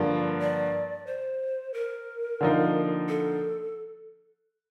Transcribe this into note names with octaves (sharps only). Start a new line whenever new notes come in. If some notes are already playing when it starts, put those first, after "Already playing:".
Already playing: G2 D3 F3 A#3 D5
D5
C5
A#4
D3 F3 A#3 D#4
A4